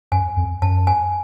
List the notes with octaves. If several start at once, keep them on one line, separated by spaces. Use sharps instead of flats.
F#2 G#5
F2
F#2 A5
G#5